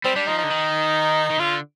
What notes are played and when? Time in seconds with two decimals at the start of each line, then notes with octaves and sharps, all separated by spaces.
0.04 G3 C4
0.16 G3 D4
0.27 F3 D#4
0.38 D#4
0.44 D3
0.50 D#3
1.30 D#3
1.39 D3 F4